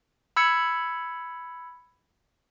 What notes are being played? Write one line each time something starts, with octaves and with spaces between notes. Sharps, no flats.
B5 E6 G#6 C#7